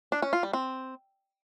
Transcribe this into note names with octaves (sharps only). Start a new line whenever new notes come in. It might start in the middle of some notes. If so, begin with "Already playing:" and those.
D4
C#4
F4
G3
C4